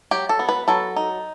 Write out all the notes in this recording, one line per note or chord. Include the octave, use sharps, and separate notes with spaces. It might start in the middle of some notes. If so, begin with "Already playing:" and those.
F#3 G4
A4
B3
B4
F#3 A4
D#4